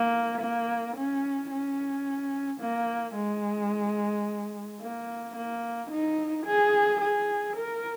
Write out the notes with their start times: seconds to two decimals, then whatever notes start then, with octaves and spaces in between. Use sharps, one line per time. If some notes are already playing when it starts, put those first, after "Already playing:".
Already playing: A#3
0.41 A#3
0.96 C#4
1.51 C#4
2.61 A#3
3.16 G#3
4.81 A#3
5.36 A#3
5.91 D#4
6.46 G#4
7.01 G#4
7.57 A#4